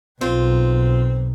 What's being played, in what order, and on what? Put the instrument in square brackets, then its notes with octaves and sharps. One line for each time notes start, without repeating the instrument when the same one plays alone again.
[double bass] B1 [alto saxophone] C4 [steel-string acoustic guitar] F4